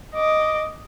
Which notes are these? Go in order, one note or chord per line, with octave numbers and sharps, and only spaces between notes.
D#5 D6